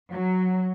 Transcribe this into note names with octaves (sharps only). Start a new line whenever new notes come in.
F#3